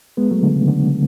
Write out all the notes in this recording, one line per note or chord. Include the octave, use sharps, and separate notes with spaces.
G#3 B3
F#3 A3
D3
C#3
D3